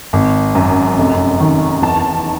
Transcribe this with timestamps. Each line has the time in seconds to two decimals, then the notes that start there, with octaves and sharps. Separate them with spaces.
0.13 G#1
0.55 F#2
0.98 F1
1.40 D#3
1.82 E2 A5